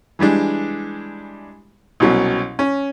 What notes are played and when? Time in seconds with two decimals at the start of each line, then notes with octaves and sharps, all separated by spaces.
0.19 E3 G3 G#3 D4
2.00 C2 B2 F#3 C#4
2.59 C#4